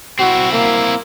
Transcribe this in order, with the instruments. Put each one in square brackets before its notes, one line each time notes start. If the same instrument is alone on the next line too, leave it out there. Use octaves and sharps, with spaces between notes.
[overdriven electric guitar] C4 E4 [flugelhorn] F#4
[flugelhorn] A#3